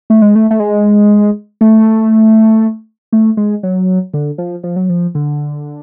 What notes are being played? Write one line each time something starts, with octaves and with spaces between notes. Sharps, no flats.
A3
G#3
A3
A3
G#3
A3
A3
G#3
F#3
D3
F3
F3
F#3
F3
D3